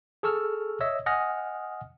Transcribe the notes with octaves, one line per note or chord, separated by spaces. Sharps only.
G#4 A4 C#6 E6 F6
C#5 D#5 E5 E6
D#5 F#5 G#5 D#6 F6 A#6